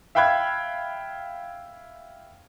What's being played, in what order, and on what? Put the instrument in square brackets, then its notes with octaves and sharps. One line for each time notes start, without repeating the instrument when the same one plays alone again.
[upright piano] E5 F5 G5 B5 F#6 G#6